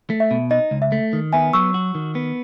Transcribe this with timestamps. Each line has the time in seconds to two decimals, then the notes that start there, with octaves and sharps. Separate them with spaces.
0.10 A3
0.20 E5
0.31 B2
0.51 D#4 D#5
0.71 C#2
0.82 E5
0.92 A3
1.13 D#3
1.33 B3 E5 G#5
1.53 F#3 C#6 E6
1.74 F#4
1.95 D#3
2.15 B3